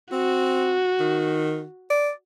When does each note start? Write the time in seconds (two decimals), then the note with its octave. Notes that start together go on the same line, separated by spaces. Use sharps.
0.12 C4 F#4
1.00 D#3
1.90 D5